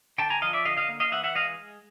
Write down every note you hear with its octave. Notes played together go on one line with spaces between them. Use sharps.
D3 G5 A5
G#5 A#5
F3 D#5 F5
D5 E5
D3 D#5 F5
D#5 F5
A#3
D#5 F5
E3 E5 F#5
E5 F#5
G#3 D#5 F5